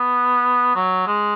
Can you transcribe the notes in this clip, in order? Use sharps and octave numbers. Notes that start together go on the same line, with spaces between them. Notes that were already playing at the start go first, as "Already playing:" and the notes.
Already playing: B3
F#3
G#3